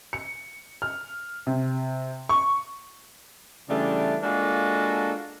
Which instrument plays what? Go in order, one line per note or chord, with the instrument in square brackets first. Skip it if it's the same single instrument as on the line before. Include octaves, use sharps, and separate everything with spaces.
[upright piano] C#7
F6
C3
C#6
[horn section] C#3 E3 G3 A3 D4
G#3 A#3 D4 F4 F#4 A4